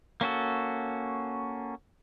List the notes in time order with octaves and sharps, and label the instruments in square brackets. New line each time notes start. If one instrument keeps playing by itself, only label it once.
[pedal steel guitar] A#3 C#4 F#4 A4